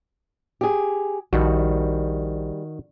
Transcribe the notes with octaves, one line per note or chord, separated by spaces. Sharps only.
G4 G#4
A#1 D#3 G3 F#4